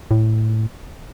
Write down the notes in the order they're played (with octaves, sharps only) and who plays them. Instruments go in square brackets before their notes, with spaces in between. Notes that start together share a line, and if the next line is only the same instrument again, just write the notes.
[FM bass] A2